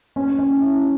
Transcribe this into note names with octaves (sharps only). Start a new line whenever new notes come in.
C#4
C#4
E4